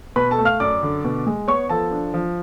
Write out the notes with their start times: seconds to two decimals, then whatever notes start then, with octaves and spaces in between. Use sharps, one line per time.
0.16 B2 B4 B5
0.31 A4 A5
0.38 A3
0.45 F5 F6
0.60 F#2 D5 D6
0.82 D3
1.04 B2
1.27 G#3
1.48 B3 C#5 C#6
1.69 F3 A4 A5
1.91 D4
2.14 F3